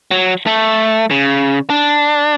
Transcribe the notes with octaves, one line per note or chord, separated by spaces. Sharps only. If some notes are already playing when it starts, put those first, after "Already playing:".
F#3
A3
C#3
D4